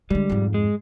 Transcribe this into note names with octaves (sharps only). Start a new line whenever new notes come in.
D3 G3 G#3
F2 G#2
G#3